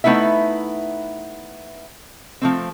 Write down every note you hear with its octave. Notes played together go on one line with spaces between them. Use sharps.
A3 B3 D#4 E4 E5
F3 A3 C4